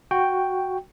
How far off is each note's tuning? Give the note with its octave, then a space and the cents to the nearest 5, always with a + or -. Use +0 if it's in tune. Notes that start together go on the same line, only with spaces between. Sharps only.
F#4 +0 G5 +0